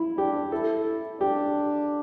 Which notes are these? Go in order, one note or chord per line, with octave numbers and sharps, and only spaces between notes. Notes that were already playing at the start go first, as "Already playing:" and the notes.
Already playing: E4
D4 G4
E4 A4
D4 G4